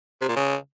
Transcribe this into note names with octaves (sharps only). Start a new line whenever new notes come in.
C3
A#2
C#3